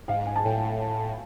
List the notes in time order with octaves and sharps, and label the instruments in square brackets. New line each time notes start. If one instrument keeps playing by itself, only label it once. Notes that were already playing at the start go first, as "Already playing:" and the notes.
[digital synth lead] G#2 [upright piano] F5
[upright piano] G#5
A5
[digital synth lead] A2 [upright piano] G5